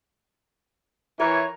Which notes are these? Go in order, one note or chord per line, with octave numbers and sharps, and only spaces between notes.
E3 A#4 C#5